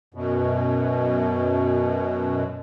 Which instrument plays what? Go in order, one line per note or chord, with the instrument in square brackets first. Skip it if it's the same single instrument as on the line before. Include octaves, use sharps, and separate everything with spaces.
[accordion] F#2 B2